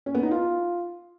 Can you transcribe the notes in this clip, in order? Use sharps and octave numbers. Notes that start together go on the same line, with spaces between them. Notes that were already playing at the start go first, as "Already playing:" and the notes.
C#4
B3
D#4
F4